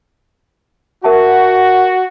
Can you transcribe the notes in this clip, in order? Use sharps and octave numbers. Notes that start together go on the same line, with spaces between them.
F#4 A#4 E5 A5